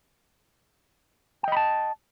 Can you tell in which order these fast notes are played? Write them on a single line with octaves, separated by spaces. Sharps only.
G5 D#5 B5 A5